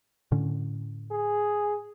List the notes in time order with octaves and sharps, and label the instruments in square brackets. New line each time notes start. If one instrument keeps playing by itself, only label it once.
[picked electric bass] A2 D3 C#4
[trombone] G#4